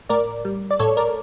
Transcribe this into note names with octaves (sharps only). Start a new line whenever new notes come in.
A2 A#4 D5
G3
D5
A2 A4 C#5
A#4 D5